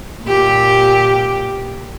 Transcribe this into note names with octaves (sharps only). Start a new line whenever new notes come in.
A#2 G4